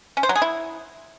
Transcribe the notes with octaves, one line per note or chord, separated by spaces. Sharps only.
C#4
C5
F#3
G#4
E4